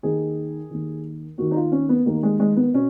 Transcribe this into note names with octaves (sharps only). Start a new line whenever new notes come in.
D#2 D#3 G#4
D#2 D#3
D#2 D#3 F#4
D#4
F4
C#4
B3
D#2 D#3 A#3
G#3
G#3
B3
B2 C#4